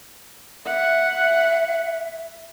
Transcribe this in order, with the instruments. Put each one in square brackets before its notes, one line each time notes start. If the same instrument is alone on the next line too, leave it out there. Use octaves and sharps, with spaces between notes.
[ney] E5 [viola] F#5